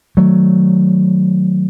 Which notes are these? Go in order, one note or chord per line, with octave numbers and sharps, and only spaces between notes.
D#3 F#3 A3